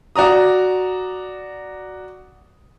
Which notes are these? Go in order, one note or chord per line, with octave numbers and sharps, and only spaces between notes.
F#4 D5 A#5 D#6